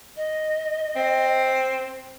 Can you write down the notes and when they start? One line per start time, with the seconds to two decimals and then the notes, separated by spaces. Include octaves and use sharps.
0.16 D#5
0.96 C4